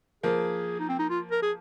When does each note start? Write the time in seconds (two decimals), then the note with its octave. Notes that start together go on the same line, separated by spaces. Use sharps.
0.23 F3 A#3 G#4
0.79 D#4
0.89 C4
0.99 D#4
1.10 F4
1.32 A#4
1.42 G#4